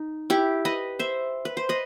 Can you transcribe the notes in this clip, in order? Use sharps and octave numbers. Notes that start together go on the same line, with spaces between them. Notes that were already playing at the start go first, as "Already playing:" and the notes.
Already playing: D#4
E4 G4
B4 D#5
C5 E5
B4
C5
B4 D#5